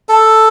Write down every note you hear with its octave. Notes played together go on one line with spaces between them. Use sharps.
A4